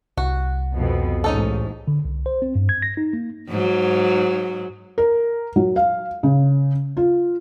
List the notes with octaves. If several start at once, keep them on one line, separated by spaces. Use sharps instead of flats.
C2 F#4
F2 B2
A1 G#2 C#4 D#4 A4
D3
C2
C5
C4
G2
G#6
A#6
D#4
A#3
G#2 F#3
A#4
F#3
F5
C#3
F4